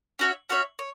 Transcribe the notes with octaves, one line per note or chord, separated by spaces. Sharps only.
C#4 F#4 C#5 E5
C#4 F#4 C#5 E5
C#5